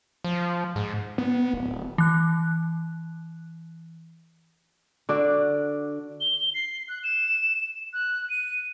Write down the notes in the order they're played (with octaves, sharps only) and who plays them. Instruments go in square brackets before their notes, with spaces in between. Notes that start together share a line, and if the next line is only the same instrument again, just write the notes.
[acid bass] F3
G#2
[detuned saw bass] B3
D1
[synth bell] E3 F#6
[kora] D3 D4 F#4 D5
[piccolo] G7
C7
F#6
E7
F#6
D#7